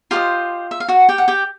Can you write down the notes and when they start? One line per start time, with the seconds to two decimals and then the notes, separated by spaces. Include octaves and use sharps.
0.11 F4 G4 C5 D#5 F5
0.71 E5
0.80 F5
0.88 F#4 F#5
1.09 G4 G5
1.18 F#5
1.28 G4 G5